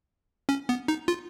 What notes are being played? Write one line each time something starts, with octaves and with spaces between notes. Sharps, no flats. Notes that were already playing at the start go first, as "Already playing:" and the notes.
C#4
B3
D#4
F4